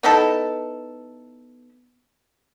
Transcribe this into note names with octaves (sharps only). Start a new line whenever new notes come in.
B3 D#4 E4 A4